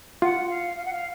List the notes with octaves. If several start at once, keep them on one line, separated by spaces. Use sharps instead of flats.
F4 F#5
F5
F5
F#5
F5